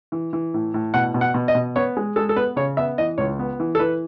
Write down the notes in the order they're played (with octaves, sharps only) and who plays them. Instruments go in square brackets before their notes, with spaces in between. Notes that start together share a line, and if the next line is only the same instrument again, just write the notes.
[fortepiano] E3
E3
A2
A2
B2 F#5
B2
F#5
B2
D#5
B2
B3 C#5
G#3
G#3 A4
A4
B3 B4
C#3 C#5
B3 E5
E3 D#5
C#2 C#5
B3
E3
A4
E3 B4